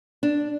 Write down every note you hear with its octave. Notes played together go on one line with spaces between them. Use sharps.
D4